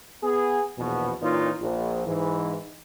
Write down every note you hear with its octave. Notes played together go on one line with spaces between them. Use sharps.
B3 G#4
A#1 E2 B2
A#2 E3 C#4 D#4 F4
A#1
G#2 E3